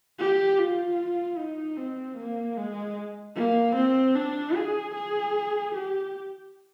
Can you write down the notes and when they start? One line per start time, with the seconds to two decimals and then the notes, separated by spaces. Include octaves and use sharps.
0.19 G4
0.59 F4
1.38 D#4
1.77 C4
2.17 A#3
2.57 G#3
3.36 A#3
3.75 C4
4.16 D4
4.56 G#4
4.94 G#4
5.74 G4